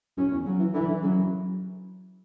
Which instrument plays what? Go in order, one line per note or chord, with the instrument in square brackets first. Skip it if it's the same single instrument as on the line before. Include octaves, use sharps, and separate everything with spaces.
[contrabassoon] F#2 [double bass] C#4
[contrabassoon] E2
[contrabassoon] C#3 [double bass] F#3
[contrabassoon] E3
[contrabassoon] D3 [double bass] E3
[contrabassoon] D3
[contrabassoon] C#3 [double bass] F#3
[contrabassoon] F#2